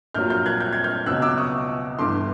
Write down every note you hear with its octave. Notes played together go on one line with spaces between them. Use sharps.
A#1 A#2 F#3 F6 G6
F6 G6
F#6 G#6
G6
G#6
F6 G6
C#2 B2 F#3 E6 F#6
D6 E6
C#6 D#6
G1 G2 E3 C6 D6